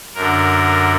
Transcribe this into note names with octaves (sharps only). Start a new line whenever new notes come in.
F#2 D3 A#4